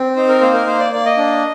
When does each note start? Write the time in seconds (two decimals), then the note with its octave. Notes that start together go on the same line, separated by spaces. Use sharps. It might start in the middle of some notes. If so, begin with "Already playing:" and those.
Already playing: C4
0.16 D#4 C5
0.29 A#4
0.41 A#3 C5
0.54 A#4
0.67 A#3 C5
0.79 D5
0.92 A#3 D5
1.06 D#5
1.17 D4